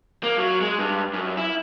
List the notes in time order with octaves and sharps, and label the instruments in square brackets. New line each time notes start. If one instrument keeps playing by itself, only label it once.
[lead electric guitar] A#3
F#3
G#3
G2
F#2
E4